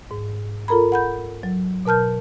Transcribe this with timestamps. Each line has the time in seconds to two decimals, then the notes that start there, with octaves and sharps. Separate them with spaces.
0.11 G#2
0.68 F4 A4 A#4 A#5 B5
0.92 F#5 B5 G6
1.43 F#3
1.85 B2 A#4 A5 F6 G6